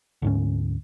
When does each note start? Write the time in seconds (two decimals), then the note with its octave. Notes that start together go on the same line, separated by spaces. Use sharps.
0.22 D2 G#2 C#4